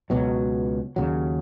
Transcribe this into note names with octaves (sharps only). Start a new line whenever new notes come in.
C#2 B2 F#3
D#2 C#3 F#3